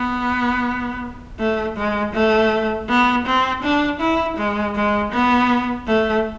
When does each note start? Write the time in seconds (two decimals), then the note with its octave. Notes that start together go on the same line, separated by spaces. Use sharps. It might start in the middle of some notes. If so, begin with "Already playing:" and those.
Already playing: B3
1.39 A3
1.77 G#3
2.14 A3
2.89 B3
3.26 C4
3.63 D4
4.00 E4
4.37 G#3
4.75 G#3
5.12 B3
5.87 A3